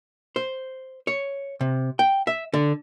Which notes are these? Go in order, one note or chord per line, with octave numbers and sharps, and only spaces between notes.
C5
C#5
C3
G5
E5
D3